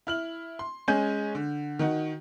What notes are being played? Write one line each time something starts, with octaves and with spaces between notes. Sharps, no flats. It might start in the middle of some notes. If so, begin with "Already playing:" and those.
E4 F6 F#7
C6
G#3 C#4 G#5 G6
D3
D#3 D#4 F#4